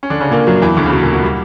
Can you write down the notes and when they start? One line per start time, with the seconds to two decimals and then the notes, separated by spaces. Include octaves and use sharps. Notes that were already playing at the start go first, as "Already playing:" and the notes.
0.03 C#4
0.10 D3 D4
0.21 C#3 C#4
0.31 A#2 A#3
0.47 F#2 F#3
0.62 E2 E3
0.77 D2 D3
0.86 C#3
0.92 B2
1.03 A#2
1.13 B2
1.23 G3